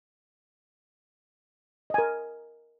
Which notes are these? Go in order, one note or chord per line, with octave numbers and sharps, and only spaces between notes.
A#4 D#5 G#5